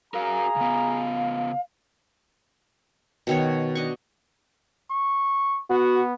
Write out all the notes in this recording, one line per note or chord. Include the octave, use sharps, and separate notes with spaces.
F#4 G#4 A#4 F5 A#5
C#3 B3
B2 D#3 C#5
D4 D#5 C#6
C#6
B3 F#4